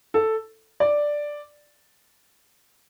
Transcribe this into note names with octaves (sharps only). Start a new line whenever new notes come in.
A4
D5